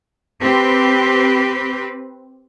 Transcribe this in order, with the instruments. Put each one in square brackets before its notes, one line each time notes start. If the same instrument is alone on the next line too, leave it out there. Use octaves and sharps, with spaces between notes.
[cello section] C4 G4 B4